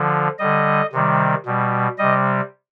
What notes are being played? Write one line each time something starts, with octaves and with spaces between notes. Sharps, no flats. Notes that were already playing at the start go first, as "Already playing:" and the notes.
Already playing: D3 F3
D3 G3 D#5
C3 D#3 G3
B2 G3
C3 G3 D#5